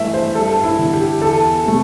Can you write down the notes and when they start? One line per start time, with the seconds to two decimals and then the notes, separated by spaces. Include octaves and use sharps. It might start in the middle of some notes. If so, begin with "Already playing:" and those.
Already playing: G2 E3 A3 E5
0.14 C5
0.35 G2 A4
0.64 E4
0.79 D3 G3
0.93 G4
1.21 E2 A4
1.64 C3 A3